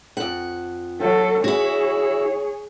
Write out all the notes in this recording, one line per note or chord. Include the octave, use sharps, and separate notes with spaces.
F2 F#5
F#3 A4
E4 F#4 G#4 C#5